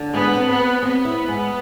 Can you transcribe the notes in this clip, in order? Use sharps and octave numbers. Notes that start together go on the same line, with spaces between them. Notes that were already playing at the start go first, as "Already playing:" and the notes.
Already playing: D3
G#2 B3
C4
B3
C4
B3 C4
E4
G#2